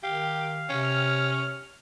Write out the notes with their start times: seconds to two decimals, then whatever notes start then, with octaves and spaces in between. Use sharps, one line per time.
0.03 D#3 G4 F5
0.69 C3 C#4
0.83 F6